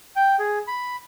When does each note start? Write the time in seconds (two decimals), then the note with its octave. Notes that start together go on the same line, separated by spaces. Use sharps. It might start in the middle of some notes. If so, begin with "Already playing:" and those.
0.16 G5
0.39 G#4
0.68 B5